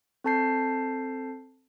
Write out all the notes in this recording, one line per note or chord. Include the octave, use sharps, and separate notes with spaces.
C4 A4 A5 G6 C7